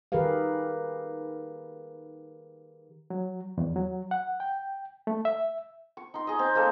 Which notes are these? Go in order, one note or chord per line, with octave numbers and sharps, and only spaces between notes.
D#3 G4 G#4 A#4 B4 F5
F#3
E2
F#3
F#5
G5
A3
E5
C#6
D#4 C6
G#4 D#5
C4
G#3 A#3 A4